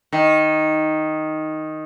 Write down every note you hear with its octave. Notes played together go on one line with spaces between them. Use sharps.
D#3